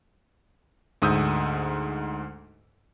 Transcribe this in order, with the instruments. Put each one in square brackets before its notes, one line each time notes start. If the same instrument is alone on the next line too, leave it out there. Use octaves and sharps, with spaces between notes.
[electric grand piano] D2 G#2 D#6 E6 G6